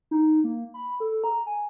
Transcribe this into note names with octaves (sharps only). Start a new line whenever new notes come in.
D#4
A#3
B5
A4
A#5
G#5